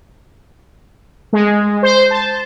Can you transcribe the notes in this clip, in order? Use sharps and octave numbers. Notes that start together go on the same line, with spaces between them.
G#3
C5
A5